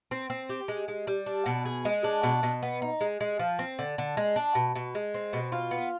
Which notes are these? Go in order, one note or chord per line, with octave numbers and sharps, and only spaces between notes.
C4
C4
G4
G#3
G#3
G3
D4
B2
G#4
G#3
D4
B2
B2
B3
D#4
G#3
G#3
F3
C4
D3
D3
G#3
D4
B2
B2
G#3
C4
B2
F4
B3